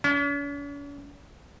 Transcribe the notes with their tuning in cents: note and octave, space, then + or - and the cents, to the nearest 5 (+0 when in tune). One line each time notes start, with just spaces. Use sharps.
C#4 +45